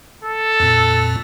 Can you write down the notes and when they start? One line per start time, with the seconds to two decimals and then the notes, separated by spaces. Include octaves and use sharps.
0.24 A4
0.60 F2 A#2